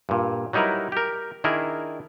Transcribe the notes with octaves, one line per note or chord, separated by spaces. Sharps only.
G2 A#2
F#3 G3 D#4 E4 A#4 B4
G4 A#4
D#3 D4 E4 G#4 A#4